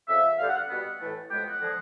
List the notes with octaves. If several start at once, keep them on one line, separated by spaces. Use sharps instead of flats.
F2 C#3 F3 E5
G2 D3 G3 F5
F#5
F#5
B2 G3 B3
A2 E3 A3
A2 F3 G#3 B3 G5
F#5
D3 F3 G#3